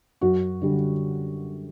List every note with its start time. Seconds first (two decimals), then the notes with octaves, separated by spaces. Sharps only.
0.21 F#2 F#4
0.62 D3 G3